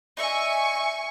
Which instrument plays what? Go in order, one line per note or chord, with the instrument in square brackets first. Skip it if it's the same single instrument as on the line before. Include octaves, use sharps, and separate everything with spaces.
[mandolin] D#4 D5 E5 [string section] G#5 C#6